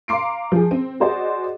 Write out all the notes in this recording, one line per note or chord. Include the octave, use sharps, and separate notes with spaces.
F5 A#5 C6 D6 C7 D7
F3 G#4
C4
F#4 G#4 C5 D5 D#5 F#5